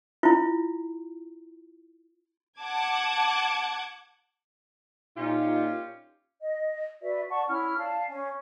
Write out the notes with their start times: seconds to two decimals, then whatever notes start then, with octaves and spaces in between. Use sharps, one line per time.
0.23 E4 F4
2.59 F#5 A5 D6 G#6
5.17 A#2 C#4 D#4 F4 G4
6.41 D#5
7.01 F#4 B4 D5 E5
7.29 D5 F#5 A5 C#6
7.48 C#4 E4 F6
7.78 D5 F5 A5
8.08 C#4 G#5